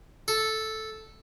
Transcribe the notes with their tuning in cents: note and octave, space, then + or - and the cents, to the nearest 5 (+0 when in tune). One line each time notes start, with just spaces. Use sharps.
A4 -5